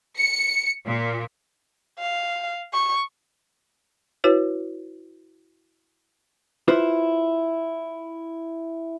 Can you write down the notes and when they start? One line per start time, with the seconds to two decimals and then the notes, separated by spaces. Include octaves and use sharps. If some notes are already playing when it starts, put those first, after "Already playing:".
0.18 C#7
0.86 A#2
1.99 F5
2.73 C#6
4.24 E4 F#4 B4 C#5
6.68 E4 F4 B4 C5